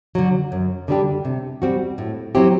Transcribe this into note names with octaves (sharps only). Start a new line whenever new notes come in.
D3 F#3
F#2
D3 G3 D4 G4
C3
G3 C4 F#4
A2
F#3 C4 E4 G4